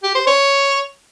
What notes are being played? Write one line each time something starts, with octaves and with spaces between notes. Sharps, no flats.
G4
C5
C#5